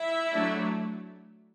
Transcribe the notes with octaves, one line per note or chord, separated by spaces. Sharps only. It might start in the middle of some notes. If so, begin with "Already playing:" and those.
Already playing: E4 E5
F#3 A3 D4